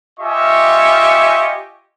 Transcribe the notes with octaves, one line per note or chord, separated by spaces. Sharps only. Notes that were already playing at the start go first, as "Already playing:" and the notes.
F4 G4 D#5 E5 G#5 C#6